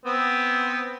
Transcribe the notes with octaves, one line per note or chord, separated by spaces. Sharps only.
B3 C4